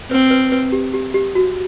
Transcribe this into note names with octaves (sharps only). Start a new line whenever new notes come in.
C4 B4
B4
B4
G4
G4
G4
F#4